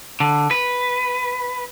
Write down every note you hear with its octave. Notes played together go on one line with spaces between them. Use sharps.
D3
B4